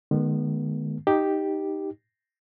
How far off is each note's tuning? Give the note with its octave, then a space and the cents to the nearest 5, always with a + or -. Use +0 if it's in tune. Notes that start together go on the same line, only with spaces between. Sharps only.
D#3 -40 G#3 +20 B3 -30
D#4 +0 G4 +0